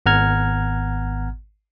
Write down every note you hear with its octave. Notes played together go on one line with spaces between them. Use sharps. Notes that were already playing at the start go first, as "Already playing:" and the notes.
G#1 B3 F#5 A#5 F6 G#6